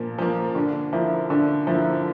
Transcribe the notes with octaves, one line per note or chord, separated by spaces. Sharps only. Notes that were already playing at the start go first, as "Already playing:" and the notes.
Already playing: A#2 F3 A#3
F3 A#3
D3
F3 A#3 E4
D3
F3 A#3 E4